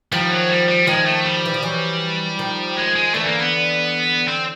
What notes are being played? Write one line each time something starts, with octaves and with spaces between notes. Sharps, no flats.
D#3 F3 G3
F#3
G3
G3
D#3 F3 G#3
A3
G3
E3
F3
E3 F#3
D#3 F3
G#3
G#3
D3 E3 A3
A#3
B3
C4